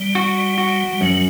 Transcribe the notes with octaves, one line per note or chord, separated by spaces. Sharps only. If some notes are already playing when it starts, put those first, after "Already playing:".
Already playing: G3
F#4
F#4
G3
F#2 F#3